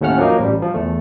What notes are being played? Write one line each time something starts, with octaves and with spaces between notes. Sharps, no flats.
D#2 A2 A3 C#4 F#5 F6
F3 F#3 A#3 D#4
A1 G3
F3
E2 A3